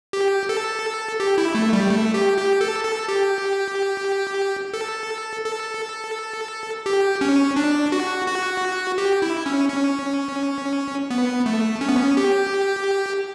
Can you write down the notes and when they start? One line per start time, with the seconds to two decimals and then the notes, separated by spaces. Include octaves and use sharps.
0.13 G4
0.49 A4
1.20 G4
1.38 E4
1.55 A3
1.73 G3
1.90 A3
2.14 G4
2.38 G4
2.61 A4
2.84 A4
3.08 G4
4.74 A4
5.45 A4
6.86 G4
7.21 C#4
7.56 D4
7.92 F#4
8.28 F#4
8.98 G4
9.22 E4
9.46 C#4
9.69 C#4
11.11 B3
11.46 A3
11.81 C#4
11.89 B3
11.96 C#4
12.17 G4